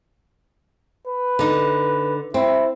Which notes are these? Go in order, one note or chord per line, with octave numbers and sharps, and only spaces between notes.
B4
D3 D#4
C4 E4